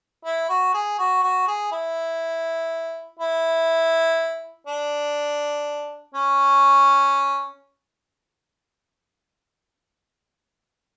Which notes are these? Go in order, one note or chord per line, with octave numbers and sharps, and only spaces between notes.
E4
F#4
G#4
F#4
F#4
G#4
E4
E4
D4
C#4